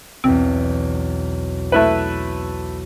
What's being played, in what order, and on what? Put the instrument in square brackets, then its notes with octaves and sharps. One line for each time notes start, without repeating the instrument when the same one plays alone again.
[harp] B1 E2 [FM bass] C4
[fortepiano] A3 E4 B4